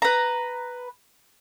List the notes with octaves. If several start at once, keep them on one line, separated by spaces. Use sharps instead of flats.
B4 A#5